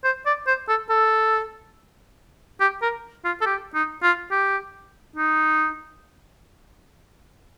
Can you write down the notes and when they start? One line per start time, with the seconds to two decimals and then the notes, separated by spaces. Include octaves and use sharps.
0.04 C5
0.26 D5
0.47 C5
0.68 A4
0.89 A4
2.60 G4
2.82 A#4
3.25 F4
3.41 A4
3.46 G4
3.74 D#4
4.03 F4
4.31 G4
5.16 D#4